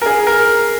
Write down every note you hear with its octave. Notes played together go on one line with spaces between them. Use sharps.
A#4
G#4
A#4